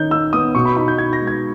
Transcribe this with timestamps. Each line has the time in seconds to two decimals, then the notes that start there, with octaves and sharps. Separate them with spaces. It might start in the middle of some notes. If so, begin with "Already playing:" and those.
Already playing: D#3 C#4 D#4 G6
0.11 D#4 E6
0.33 B3 D#6
0.55 B2 C#6
0.65 B5
0.76 D#4 B5
0.88 G6
0.98 D#4 G#6
1.13 A#6
1.20 G#3
1.27 G#6